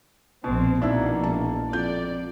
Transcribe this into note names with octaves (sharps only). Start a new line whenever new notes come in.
A#1 B2 C4
A#1 B2 D#3 A#3 D4 E4 E6
E1 A5
F2 D5 G6